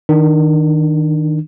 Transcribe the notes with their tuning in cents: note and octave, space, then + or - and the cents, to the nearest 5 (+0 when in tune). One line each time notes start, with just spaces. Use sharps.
D#3 +10 D4 +25